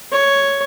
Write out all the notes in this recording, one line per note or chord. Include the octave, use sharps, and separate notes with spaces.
C#5